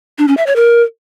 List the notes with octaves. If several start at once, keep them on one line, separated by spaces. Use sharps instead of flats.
D4
C#4
E5
C#5
A#4